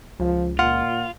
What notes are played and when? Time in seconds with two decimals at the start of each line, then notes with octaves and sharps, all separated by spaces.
0.20 C#2 F3
0.59 A#2 F4 F#5